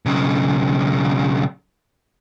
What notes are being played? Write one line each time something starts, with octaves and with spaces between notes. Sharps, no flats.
B1 C#3